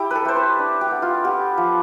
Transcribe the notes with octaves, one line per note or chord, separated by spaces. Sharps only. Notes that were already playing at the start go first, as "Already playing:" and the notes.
Already playing: E4 G4
A4 B4
A3 C5
B4
D4
G4
B3
F4
B3 G4
F3